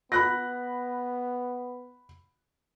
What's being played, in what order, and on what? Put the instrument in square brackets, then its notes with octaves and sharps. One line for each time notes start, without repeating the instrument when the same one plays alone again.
[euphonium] B3 [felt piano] B5 F#6 A#6